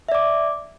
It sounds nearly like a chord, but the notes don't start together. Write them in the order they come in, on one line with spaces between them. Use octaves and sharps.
E5 D5 D6